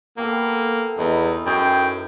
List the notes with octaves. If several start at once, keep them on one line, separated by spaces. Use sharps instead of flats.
A#3 B3 G4 A4
E2 D#4 E4 D#5
F#2 G#4 G5